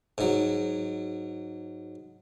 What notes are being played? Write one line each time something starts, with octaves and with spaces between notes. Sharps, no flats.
G#2 F#3